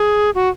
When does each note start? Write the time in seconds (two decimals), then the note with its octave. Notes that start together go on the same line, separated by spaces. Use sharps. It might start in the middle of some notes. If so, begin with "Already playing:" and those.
Already playing: G#4
0.35 F#4